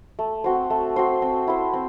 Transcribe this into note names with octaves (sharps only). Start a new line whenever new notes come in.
A3
C4 F#4 C5
A3
C4 F#4 C5
C4
E4 C5
C4